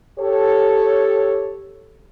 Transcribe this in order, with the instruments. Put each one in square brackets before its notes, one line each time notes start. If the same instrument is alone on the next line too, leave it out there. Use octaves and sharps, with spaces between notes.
[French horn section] G4 A4 C#5